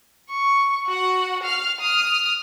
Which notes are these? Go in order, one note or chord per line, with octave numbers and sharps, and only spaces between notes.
C#6
F#4 F#5
F5 F6
D#6 F6